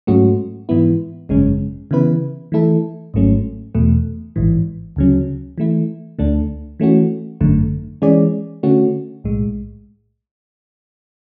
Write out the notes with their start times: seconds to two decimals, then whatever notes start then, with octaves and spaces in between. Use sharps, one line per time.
0.07 G#2 F#3 A3 C#4 F#4
0.69 G#2 E3 B3 E4
1.29 G#1 F#2 C#3 G#3 C#4
1.91 C#3 E3 B3 E4 B4
2.52 E3 A3 E4 A4
3.14 G#1 G#2 F#3 A3 C#4
3.74 E2 B2 A3
4.36 A1 G#2 E3
4.96 D2 C#3 F#3 C#4
5.58 E3 A3 E4
6.19 D2 D3 A3 D4
6.80 E3 A3 C#4 F#4
7.41 G#1 F#2 D3 A3
8.02 E3 G#3 C#4 G#4 D5
8.63 D3 A3 C#4 F#4
9.24 B1 A2 G#3